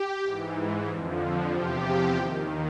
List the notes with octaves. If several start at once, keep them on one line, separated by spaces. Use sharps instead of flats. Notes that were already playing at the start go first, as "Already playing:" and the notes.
Already playing: G4
G#2 E3
F2 D3 F3
E2 C3 F3 F4 G4
D#2 D#3